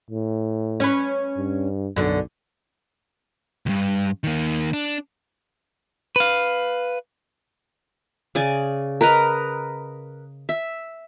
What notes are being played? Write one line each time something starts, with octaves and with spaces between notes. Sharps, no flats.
A2
C#4 B4
G2
B1 F#2 D3
C#2 G2
D#3 A#3
D4
B4 F5
C#3 D5 G#5
A#4 B4 D#5 A#5
E5